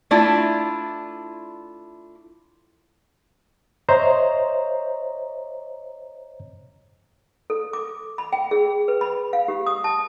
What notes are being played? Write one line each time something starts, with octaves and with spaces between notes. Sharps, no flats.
A3 D4 E4 F4
C5 C#5 D#5 E5 A#5
A4
D6
B5
G5
G#4
B4
B5
F5
G4
D#6
A5